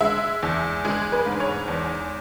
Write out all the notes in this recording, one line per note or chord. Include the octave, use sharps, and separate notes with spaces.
G#3 E5
E2
G#3 G#4
B4
G#2
C#5
E2